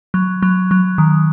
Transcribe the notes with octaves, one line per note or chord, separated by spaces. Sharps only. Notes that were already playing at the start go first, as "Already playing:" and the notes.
F#3
F#3
F#3
D#3